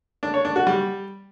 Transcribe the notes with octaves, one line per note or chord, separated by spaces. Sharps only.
D4
C#5
D4
F#4
G3